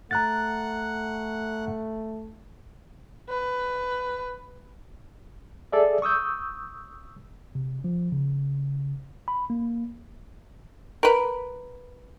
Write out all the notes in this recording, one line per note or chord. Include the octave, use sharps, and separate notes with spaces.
A3 F#5 A#5 F#6 A6
B4
G#4 A4 D5 E5
C#6 D#6 E6 G6
C3
F3
C#3
B5
A#3
A#4 B4